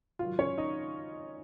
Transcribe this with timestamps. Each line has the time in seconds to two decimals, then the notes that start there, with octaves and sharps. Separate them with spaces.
0.19 G#2 D#3 F#3 F4
0.39 C#4 C#5
0.58 D#4 D#5